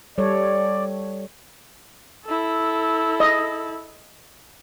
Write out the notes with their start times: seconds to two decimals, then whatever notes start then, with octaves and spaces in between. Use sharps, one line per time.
0.18 G3 A4 C#5 D5
2.26 E4 A4
3.20 D#5